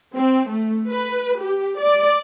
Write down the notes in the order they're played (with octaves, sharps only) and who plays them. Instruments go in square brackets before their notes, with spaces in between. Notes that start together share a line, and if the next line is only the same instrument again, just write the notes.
[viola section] C4
A3
B4
G4
D5